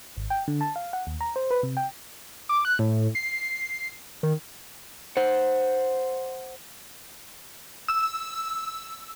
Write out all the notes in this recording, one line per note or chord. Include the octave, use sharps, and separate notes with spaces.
G#1
G5
D3
A5
F5
F#5
D#2
A#5
C5
B4
C3
G5
D6
F#6
A2
C7
D#3
C5 F#5
E6